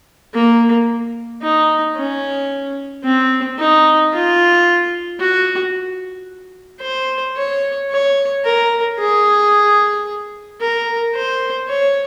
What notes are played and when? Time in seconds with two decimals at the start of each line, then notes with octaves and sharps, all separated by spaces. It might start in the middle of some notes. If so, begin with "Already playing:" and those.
0.34 A#3
1.42 D#4
1.96 C#4
3.04 C4
3.59 D#4
4.13 F4
5.20 F#4
6.82 C5
7.37 C#5
7.90 C#5
8.44 A#4
8.99 G#4
10.60 A#4
11.15 C5
11.69 C#5